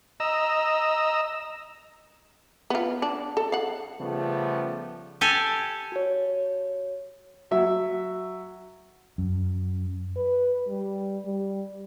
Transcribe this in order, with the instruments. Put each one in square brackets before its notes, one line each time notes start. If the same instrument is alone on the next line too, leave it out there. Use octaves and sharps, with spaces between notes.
[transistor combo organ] D#5 A#5 E6
[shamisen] B3 F4
D4
A4
F5 F#5
[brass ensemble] C#3 F3 G3 A3 B3
[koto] G4 A4 G#5
[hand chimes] F#4 C#5
[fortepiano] F#3 E5
[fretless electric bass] F#2
[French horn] B4
G3
G3